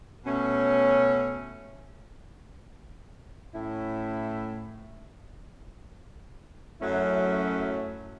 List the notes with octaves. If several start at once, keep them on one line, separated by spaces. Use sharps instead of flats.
B2 A3 C#4
A2 A3 C#4 E4
F#2 F#3 A3 C#4 E4